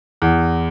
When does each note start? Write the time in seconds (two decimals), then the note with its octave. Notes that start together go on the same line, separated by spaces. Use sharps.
0.22 E2